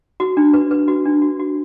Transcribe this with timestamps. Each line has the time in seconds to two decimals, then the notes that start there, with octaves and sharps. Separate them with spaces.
0.20 F#4
0.37 D4
0.53 B4
0.71 B4
0.88 F#4
1.05 D4
1.22 F#4
1.40 F#4